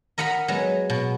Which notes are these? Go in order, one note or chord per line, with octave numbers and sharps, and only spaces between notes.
A#4 D#5 F#5 A#5 B5
F#3 G#3 B3
B2